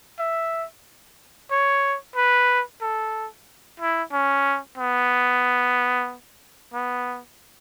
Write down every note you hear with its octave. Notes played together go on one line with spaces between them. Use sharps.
E5
C#5
B4
A4
E4
C#4
B3
B3